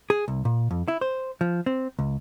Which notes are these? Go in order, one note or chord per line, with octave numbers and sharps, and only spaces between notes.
G#4
C2
A#2
F2
E4
C5
F3
C4
C#2